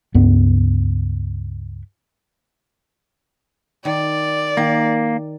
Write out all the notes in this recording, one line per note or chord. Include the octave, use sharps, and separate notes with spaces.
C#2 G2 B3
D#3 D5
D#3 A#3